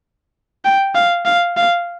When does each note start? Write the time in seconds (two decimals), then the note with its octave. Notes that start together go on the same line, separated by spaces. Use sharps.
0.65 G5
0.95 F5
1.25 F5
1.57 F5